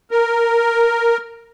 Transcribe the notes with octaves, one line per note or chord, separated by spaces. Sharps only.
A#4